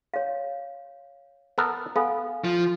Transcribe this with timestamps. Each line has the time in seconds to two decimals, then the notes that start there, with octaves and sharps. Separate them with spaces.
0.14 C#5 F5
1.58 B3 A4 A#4
1.96 B3 A4 F5 G#5
2.44 F3